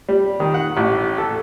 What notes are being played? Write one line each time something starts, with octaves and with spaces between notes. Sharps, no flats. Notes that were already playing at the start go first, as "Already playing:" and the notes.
G3
D#3
F#5
A1
A4